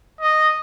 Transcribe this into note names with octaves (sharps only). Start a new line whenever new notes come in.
D#5